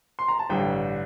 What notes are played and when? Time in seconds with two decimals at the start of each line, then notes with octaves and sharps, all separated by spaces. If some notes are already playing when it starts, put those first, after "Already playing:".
0.19 C6
0.28 A#5
0.39 A5
0.49 A1 G2 D3 G5